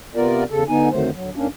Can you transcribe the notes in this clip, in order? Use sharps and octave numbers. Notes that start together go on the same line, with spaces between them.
C3 B3 F4 A#4 D5
E2 C#3 A4
D3 B3 D#4 G#5
F2 D3 D#3 F#3 A3 C5
D2 F#3
F2 G#2 A#3 C#4 D4